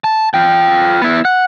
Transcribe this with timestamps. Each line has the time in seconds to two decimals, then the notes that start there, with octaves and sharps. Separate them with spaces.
0.04 A5
0.34 F4 G5
1.02 B3 E4
1.25 F#5